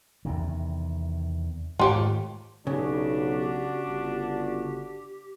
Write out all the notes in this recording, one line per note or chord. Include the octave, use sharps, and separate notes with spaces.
E2 C3 D#3
G#2 D#3 A3 F4 G4 C#5
B1 C#3 D4 F#4 G4
G1